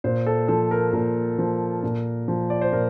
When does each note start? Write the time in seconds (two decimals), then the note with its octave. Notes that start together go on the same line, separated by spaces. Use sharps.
0.04 A#2 C5
0.26 A4
0.48 F3 A4
0.71 A#4
0.93 A#2 A#4
1.38 F3
1.83 A#2
2.28 F3
2.50 D5
2.61 C5
2.73 A#2 A#4